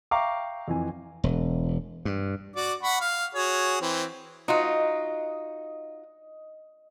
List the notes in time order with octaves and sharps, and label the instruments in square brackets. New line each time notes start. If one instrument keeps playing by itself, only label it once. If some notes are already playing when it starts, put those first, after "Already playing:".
[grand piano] E5 F5 G5 A#5 C#6 D6
F2 E3 G#5
[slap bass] E1
G2
[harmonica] F#4 D5 D6
F#5 B5 C#6
F5
F#4 G#4 C#5
E3 C4
[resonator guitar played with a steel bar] D#4 F4 F#4 [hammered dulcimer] D#5